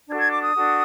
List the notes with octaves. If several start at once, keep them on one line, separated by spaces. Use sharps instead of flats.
D4 F#4 A4 G#6
G#6
D6
D#6
D4 F#4 A4